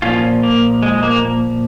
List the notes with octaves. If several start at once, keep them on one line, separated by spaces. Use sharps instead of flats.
A#2 F3 C#4 F4
A#3
G#3
A#3